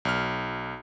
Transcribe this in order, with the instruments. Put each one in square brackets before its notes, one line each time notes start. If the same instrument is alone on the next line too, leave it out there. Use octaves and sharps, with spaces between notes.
[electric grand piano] B1 F6